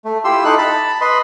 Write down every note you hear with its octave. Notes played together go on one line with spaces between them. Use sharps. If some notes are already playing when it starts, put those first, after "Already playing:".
A3
E4 F4 G4 C6 E6
D#4 E4 A4 F#6
A5 B5
B4 D#5 B5 C6